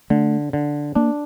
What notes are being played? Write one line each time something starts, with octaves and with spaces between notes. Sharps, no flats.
D3 A3
D3
A#3 D4